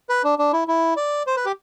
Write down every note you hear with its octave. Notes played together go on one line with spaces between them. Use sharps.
B4
D4
D4
E4
E4
D5
C5
B4
G4